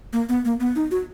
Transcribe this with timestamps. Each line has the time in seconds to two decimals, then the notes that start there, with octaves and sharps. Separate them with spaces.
0.13 A#3
0.29 B3
0.45 A#3
0.60 B3
0.76 D#4
0.91 F#4